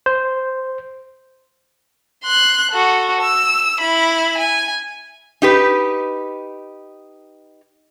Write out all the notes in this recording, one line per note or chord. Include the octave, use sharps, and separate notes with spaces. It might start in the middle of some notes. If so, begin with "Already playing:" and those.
C5
C6 F#6
F#4 A4
E6
E4 B5
G#5
D#4 G4 B4